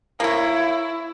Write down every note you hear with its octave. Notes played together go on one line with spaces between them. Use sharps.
A#3 E4 C#5